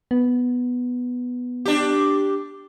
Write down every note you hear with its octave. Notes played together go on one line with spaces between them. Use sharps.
B3
D4 G4